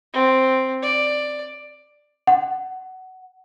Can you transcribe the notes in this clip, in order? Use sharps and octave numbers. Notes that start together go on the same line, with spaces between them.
C4
D5
F#5